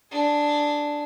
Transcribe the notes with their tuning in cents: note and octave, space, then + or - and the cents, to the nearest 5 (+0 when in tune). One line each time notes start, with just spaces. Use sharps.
D4 +0 G#4 +15